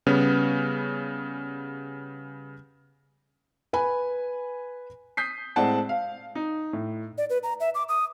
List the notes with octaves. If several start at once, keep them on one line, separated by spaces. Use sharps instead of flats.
C#3 G3 B3 C#4
B4 G#5 B5
D#6 G6 B6 C7
A2 G#3 C4 D5 F#5 A5
F5
D#4
A2
D5
B4
A#5
E5
D6
D#6